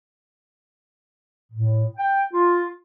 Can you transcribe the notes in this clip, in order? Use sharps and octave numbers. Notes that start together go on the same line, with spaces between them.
A2
G5
F4